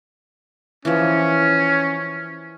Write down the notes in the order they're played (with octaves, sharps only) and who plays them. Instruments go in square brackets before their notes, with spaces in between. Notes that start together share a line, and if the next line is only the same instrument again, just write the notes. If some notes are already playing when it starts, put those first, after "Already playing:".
[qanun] E3 F3 [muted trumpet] C#4